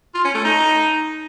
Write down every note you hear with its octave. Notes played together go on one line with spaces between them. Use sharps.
F4
C#4
A3
D#4